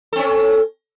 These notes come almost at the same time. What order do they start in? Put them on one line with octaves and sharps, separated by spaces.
A4 C4 C#4